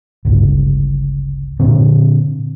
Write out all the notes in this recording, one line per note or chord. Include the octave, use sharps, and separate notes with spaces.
G1 C#2
A#2 D3 C4